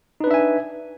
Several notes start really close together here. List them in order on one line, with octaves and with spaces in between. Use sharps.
D#4 B4 D4 E5 G#5